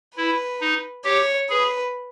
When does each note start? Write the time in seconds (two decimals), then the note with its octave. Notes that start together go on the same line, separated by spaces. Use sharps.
0.16 E4 B4
0.61 D#4
1.04 G4 C#5
1.50 G#4 B4